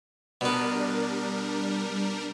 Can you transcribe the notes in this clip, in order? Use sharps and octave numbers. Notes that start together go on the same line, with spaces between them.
B2 G3 B3 D4 A#4